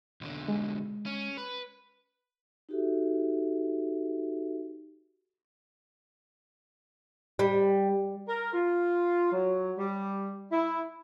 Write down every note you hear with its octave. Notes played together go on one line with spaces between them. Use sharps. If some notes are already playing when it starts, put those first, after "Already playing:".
B1 D3
G#3
C#4
B4
D#4 F#4 G4 A4 E5
G3
A#4
F4
F#3
G3
E4